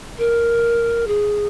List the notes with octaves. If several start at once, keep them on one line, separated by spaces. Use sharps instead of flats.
A#4
G#4